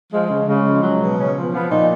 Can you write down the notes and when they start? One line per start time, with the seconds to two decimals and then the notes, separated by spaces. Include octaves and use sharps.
0.13 F3 G#3
0.30 C#3
0.48 C#3 G#3
0.66 F3
0.83 F#3
1.01 B2
1.18 C#3 C#4
1.36 F3
1.41 B3
1.53 F3 B3
1.70 A#2 D#4